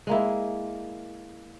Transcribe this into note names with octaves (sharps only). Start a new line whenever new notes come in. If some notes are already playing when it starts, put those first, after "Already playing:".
G#3 A#3 E4